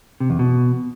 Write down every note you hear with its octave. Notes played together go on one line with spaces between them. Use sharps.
C3
E2
B2